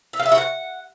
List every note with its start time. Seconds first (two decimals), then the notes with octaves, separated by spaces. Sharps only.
0.13 E5
0.19 F5
0.26 E5
0.32 F#4
0.38 F#5